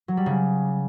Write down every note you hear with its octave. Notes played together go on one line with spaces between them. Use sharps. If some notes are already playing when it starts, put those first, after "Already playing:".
F#3
G3
C#3